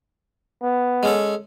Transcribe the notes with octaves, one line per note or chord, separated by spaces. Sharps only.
B3
G#3 C#4 A4